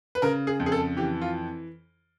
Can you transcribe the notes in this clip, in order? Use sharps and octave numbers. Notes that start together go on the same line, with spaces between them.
B4
C#3 A#4
G#4
F2
G#4
A4
E3 G4
F4